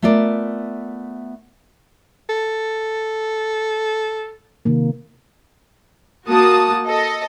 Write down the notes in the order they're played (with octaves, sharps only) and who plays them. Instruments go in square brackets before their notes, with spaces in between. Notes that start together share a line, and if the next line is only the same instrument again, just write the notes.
[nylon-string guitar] A3 B3 F4 A#4 D5
[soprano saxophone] A4
[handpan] C3 D#3 A#3
[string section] A#3 F#4 A5 D#6
A4 D#5